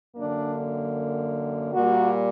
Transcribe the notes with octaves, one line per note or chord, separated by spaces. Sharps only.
F#2 D3 A#3 D4
A#2 G3 A#3 F#4